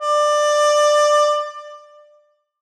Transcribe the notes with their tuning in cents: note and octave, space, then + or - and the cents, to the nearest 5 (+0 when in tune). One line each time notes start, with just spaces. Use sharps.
D5 +20